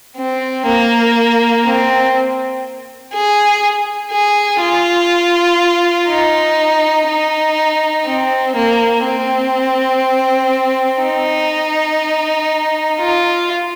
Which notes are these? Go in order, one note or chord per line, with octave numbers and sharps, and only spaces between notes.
C4
A#3
C4
G#4
G#4
F4
D#4
D#4
C4
A#3
C4
D#4
F4